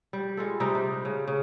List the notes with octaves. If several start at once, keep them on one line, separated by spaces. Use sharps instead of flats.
G3
G#3 F4 A4
C3 G3 D#4
D4
C#3
C#3